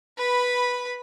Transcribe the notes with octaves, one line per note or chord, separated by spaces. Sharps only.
B4 B5